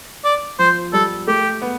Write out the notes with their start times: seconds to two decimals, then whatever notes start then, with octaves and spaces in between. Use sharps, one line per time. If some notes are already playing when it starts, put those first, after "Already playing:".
0.24 D5
0.59 F3 C5
0.93 G3 A4
1.28 A3 G4
1.62 B3